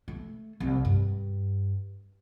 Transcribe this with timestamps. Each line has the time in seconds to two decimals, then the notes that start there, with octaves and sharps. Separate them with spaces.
0.08 A3
0.60 C2
0.85 G2